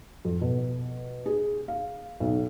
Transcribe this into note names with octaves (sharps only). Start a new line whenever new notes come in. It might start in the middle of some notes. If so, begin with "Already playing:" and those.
F2
B2
G#4
F5
B1